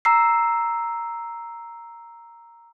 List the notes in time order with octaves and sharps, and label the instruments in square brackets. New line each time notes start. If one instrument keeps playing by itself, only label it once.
[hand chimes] A#5 E6 C7